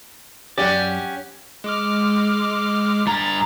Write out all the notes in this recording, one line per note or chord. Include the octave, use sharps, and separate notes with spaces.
F#2 C#4 F#4 G4 D5
G#3 D6 F6
G2 A#5 A6